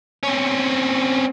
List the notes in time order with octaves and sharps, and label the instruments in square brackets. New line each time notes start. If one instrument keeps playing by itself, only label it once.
[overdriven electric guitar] C4 C#4